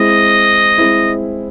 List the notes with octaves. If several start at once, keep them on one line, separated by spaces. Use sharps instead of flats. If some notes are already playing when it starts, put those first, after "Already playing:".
Already playing: G#3 C4 E4 D#5
G#3 C4 E4